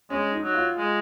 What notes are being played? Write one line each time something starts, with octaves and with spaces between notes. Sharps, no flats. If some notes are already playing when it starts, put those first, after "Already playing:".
G#3 C#4
D#4
F#3
F4
G#3